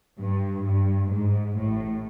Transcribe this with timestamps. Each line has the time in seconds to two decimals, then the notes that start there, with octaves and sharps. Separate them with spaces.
0.19 G2
0.65 G2
1.11 G#2
1.57 A1 A2